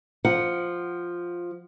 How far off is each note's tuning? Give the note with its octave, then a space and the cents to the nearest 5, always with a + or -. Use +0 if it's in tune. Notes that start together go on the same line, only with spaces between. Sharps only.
F3 +0 F#5 +0